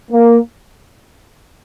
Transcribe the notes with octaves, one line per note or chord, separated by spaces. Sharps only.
A#3